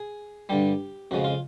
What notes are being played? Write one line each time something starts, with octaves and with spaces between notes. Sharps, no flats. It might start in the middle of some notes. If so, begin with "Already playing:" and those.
Already playing: G#4
G2 D3 G3 G4
F2 C#3 F3 G#3 F#4
F4